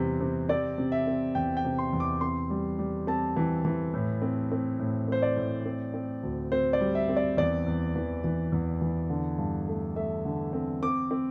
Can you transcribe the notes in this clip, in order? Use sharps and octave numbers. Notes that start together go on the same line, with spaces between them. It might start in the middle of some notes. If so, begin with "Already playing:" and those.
Already playing: E2 C3 G3 C4
C3
C4 D5
C3
E5
C4
E2 G5
G5
C3
C6
E2
D6
C4 C6
G3
G3
C4 A5
E3
E3
A2
C4
C4
A2
C4 C5
D5
A2
C4
C4
D2
C4 C5
D5
G3
E5
C4
D5
E2 D5
E2
E3
E3
E2
E3
D3
G2
A3
A3 E5
D3
C4
C4 D6
C4